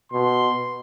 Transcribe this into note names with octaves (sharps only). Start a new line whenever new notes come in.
B2 C6